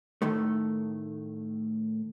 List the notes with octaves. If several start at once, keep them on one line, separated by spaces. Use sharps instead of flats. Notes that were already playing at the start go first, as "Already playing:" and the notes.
A2 D#3 A3